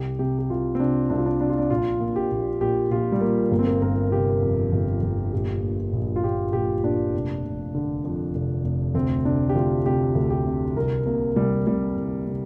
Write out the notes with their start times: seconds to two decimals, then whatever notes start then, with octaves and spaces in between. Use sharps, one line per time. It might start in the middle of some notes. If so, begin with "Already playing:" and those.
Already playing: C2 G4
0.19 C3 G4
0.39 G4
0.50 C2 F4
0.75 C4
0.80 C3 D4
1.10 C2 D4
1.18 F4
1.26 D4
1.40 C3 D4
1.49 F4
1.58 D4
1.70 A#1 F4
2.00 A#2
2.16 G4
2.31 A#1
2.61 A#2 G4
2.91 A#1 F4
3.12 G3
3.21 A#2 A#3
3.51 G1 A#3
3.59 C4
3.67 A#3
3.82 G1 A#4
4.11 C3 G4
4.42 F2
4.72 G1
5.02 G1
5.33 A#1 G4
5.63 A#2
5.93 A#1
6.16 F4
6.23 A#2 G4
6.53 A#1 G4
6.83 A#2 D4
7.14 F1
7.45 F1
7.75 D3
8.04 F2
8.35 F1
8.65 F1
8.95 D2 C4
9.25 C3 D4
9.49 G4
9.55 D2 F4
9.86 C3 G4
10.15 D2
10.30 G4
10.47 C3
10.76 C2 A#4
11.06 C3 A#3
11.36 C2 G3
11.66 C3 G3
11.97 C2
12.28 C3